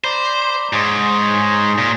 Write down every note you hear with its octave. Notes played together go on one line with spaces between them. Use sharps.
C5 D5 A#5 B5
G#2 G#4 C5 C#5
A#2